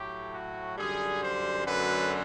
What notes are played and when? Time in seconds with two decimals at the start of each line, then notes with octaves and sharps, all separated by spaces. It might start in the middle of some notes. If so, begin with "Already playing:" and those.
Already playing: A2 F#3 A3 G4
0.34 F#4
0.78 F#2 D3 G3 G#4
1.23 C5
1.66 F#2 D3 F#3 A3 B4